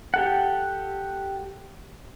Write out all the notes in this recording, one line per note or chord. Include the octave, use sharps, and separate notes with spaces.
G4 A4 F#5